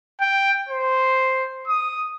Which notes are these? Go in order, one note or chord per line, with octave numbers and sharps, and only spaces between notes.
G5
C5
D#6